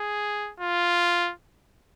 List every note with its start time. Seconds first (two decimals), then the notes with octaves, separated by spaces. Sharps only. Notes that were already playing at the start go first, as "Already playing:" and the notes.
Already playing: G#4
0.60 F4